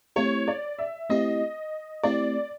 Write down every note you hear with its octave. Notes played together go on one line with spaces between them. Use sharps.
A3 C4 E4 G4 C#5
D5
E5
A3 C4 E4 G4 D#5
A3 C4 E4 G4 D5